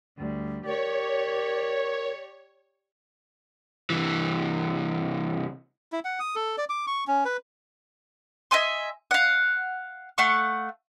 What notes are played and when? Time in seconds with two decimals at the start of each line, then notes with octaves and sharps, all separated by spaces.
0.18 D2 G3
0.66 G4 A#4 C#5 D5
3.90 C2 E3
5.92 E4
6.05 F#5
6.20 D#6
6.35 A4
6.58 D5
6.69 D6
6.87 C#6
7.07 C#4
7.25 B4
8.51 D#5 E5 G#5 C6
9.11 F5 F#5
10.18 A3 F5 F#5 C#6